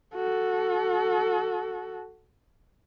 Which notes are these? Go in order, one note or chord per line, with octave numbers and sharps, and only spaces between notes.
F#4 A4